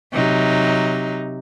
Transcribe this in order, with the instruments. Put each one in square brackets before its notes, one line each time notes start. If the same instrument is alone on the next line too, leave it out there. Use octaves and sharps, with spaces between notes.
[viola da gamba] C3 F#3 D#4